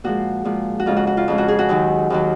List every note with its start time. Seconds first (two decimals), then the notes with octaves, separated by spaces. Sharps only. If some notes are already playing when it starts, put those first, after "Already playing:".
0.04 A#2 F3 G#3 F#4
0.45 A#2 F3 G#3
0.80 F#4
0.86 F2 C#3 G#3 F4
0.97 F#4
1.07 F#4
1.17 F4
1.28 F2 C#3 G#3
1.38 F#4
1.48 G#4
1.59 F#4
1.69 D#2 D#3 F#3
2.10 D#2 D#3 F#3